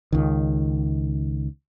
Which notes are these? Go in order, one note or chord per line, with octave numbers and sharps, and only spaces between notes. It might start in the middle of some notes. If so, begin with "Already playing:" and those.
C#2 D#3